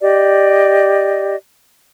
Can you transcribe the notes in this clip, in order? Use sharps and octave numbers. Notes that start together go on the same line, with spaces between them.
G4 D5 D#5